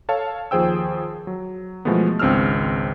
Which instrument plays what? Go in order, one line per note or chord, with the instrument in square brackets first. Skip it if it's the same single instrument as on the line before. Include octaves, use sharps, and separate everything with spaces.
[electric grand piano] A4 C#5 F5 A5
D#2 F3 G#4 C5 G5 E6
F#3
B2 E3 F3 G#3 A3 B3
G#1 C#2 C4 D4 E6 F6